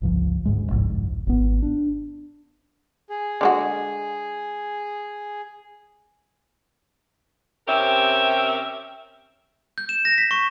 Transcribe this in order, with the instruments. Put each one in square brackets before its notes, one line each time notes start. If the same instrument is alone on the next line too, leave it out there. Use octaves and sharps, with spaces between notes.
[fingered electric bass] G1 C#2 F3
D2 G#2 G#3
G1 C2 F2 G#2
G#1 B3
D4
[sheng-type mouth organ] G#4
[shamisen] D3 G#3 F#4
[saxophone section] C3 C4 C#4 G4 A#4 E5
[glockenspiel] G6
E7
A#6
B6
C#6